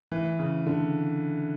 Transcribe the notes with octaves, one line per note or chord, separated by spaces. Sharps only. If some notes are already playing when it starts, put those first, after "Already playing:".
E3
C#3
D3